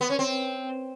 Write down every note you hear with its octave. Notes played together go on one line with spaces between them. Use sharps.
B3
C#4
C4